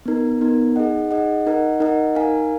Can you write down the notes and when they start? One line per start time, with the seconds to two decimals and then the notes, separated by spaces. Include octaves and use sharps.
0.06 B3 D#4 A#4
0.41 B3 D#4 A#4
0.76 D#4 G#4 D#5 F#5
1.11 D#4 G#4 D#5 F#5
1.46 D#4 A#4 D#5 F#5
1.80 D#4 A#4 D#5 F#5
2.15 D#4 A#4 F5 G#5